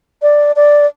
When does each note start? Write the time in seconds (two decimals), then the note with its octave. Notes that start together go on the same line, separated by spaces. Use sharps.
0.22 D5
0.56 D5